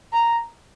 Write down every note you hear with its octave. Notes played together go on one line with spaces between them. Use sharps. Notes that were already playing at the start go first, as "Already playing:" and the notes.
A#5